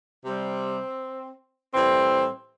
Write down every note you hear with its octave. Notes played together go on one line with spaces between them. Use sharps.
C3 G3 C4
A2 E3 G3 C4